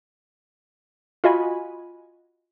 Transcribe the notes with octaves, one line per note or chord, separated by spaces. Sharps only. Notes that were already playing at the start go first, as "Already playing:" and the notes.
F4 F#4 D#5 G#5 B5